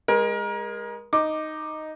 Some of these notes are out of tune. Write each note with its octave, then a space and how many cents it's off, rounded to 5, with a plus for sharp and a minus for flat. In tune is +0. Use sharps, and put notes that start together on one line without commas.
G#3 -15 A#4 +30
D#4 +0 D6 +15